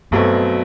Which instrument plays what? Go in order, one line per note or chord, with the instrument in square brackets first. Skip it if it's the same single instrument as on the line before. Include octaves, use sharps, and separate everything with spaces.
[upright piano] B1 B2 F#3 A3 C4 [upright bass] G2